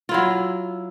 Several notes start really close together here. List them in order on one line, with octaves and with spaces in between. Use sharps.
F4 E4 F#3